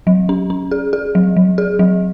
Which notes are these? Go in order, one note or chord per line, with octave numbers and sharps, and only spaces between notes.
F#3
C#4
C#4
G#4
G#4
F#3
F#3
G#4
F#3